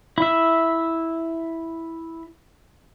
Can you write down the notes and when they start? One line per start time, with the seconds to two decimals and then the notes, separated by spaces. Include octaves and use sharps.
0.18 E4 E5